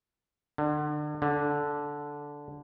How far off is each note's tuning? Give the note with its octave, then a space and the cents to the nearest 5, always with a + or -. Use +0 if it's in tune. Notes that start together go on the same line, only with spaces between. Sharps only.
D3 +30
D3 -10